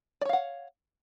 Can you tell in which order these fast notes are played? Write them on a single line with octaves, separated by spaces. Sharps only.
D5 C#5 F5 F#5